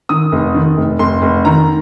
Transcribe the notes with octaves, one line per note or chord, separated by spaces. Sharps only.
D#3 D#6
F1
D#3
F1
F1 C6
F1
D#3 A#5